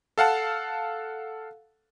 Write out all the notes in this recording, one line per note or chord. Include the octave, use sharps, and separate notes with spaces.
A4 F5 F#5 A5